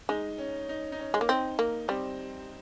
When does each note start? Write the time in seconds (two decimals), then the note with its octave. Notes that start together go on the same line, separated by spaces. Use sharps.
0.09 G#3 D#4
0.38 C#4
0.69 D#4
0.92 D#4
0.99 C#4
1.14 G#3
1.21 A#3
1.29 C4 D#4
1.59 A#3
1.88 G3 C4